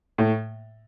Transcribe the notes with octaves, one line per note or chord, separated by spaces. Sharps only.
A2